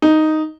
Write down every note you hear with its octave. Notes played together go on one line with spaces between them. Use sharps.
D#4